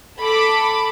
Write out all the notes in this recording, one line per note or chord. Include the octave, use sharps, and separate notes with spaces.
A4 B5 D6